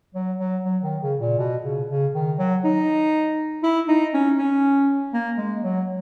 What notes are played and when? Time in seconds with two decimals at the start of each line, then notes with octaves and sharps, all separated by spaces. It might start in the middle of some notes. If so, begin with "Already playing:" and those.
0.15 F#3
0.39 F#3
0.64 F#3
0.83 D#3
1.02 C#3
1.20 A#2
1.39 B2
1.65 C#3
1.90 C#3
2.14 D#3
2.39 F#3
2.64 D#4
3.63 E4
3.88 D#4
4.14 C#4
4.38 C#4
5.13 A#3
5.38 G#3
5.64 F#3